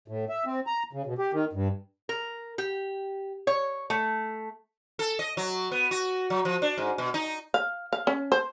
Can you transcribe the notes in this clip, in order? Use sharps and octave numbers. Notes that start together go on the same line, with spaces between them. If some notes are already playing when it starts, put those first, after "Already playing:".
A2
E5
C4
A#5
C#3
B2
G4
D#3
G2
A#4
G4
C#5
A3
A4
D#5
F#3
B3
F#4
F#3
F3
D4
G#2
B2
D#4
F5
F5
C#4
C5